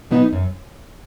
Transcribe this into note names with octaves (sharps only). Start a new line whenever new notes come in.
B2 F#3 B3 D#4
F#2